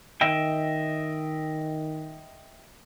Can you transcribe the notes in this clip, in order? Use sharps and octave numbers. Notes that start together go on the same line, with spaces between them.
D#3 D#5 E5 G5